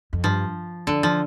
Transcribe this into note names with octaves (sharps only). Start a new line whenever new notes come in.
F2
G2 F3
F2 D3
F3